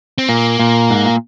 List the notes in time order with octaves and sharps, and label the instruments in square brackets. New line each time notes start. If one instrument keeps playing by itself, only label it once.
[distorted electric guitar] C4
[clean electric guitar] A#2 [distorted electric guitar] A#3
[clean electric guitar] A#2
G#2
A#2